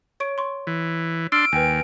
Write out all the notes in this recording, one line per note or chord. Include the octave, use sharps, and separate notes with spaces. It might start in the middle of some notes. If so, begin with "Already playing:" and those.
C#5 C#6 D7
C6 C#6
E3
D4 C6 E6 F6 D7
D#2 B4 G5 G#5